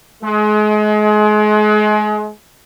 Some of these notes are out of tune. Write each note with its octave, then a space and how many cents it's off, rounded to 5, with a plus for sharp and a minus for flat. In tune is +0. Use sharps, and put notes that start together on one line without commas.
G#3 +35